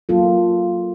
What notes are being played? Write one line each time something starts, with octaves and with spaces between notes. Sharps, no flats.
F#3 A#3 F4 A4